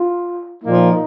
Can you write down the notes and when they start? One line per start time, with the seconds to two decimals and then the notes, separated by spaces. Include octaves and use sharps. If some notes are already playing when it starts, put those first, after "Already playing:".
Already playing: F4
0.63 A#2 F3 A#3 D#4